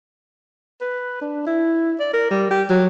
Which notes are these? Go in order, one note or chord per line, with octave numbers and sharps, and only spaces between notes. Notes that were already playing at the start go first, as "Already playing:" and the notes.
B4
D4
E4
D5
A#4
G3
G4
F#3